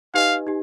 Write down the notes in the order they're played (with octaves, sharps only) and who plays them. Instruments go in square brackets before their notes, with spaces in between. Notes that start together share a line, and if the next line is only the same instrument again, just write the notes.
[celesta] D#4 G4 B4 D#5 G#5 [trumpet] F5
[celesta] D#4 G4